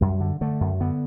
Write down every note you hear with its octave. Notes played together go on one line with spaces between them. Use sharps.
F#2 G3
D3
D3 A3
F#2
D3 B3